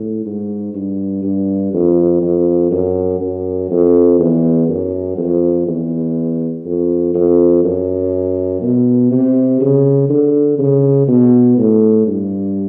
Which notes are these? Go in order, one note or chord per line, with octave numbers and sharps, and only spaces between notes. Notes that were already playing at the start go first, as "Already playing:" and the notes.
Already playing: A2
G#2
G2
G2
F2
F2
F#2
F#2
F2
E2
F#2
F2
E2
F2
F2
F#2
B2
C3
C#3
D3
C#3
B2
A2
G2